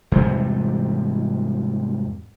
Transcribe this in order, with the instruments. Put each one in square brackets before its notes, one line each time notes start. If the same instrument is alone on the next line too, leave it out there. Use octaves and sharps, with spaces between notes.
[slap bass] E2 G#2 C3 G3